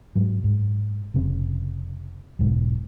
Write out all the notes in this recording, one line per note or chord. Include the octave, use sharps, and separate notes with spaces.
G#2 F#3
G#2
F1 C#3 C4
E1 B1 G#2